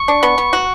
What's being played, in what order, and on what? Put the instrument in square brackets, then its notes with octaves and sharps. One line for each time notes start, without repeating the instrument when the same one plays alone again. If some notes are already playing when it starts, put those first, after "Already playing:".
Already playing: [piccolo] C#6
[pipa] D4
B3
B3
F#4